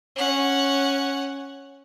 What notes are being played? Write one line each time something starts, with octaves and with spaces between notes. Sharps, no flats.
C#4 F#5